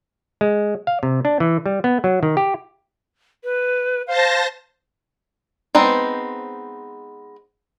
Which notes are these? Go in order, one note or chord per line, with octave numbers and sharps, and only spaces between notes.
G#3
F5
C3
D4
E3
G3
B3
F#3
D#3
G4
B4
C5 F5 A5 A#6
G#3 B3 C4 D#4 C5